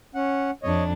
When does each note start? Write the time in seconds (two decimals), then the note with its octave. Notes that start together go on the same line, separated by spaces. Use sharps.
0.15 C#4 F#5
0.63 F2 D4 C#5 D#5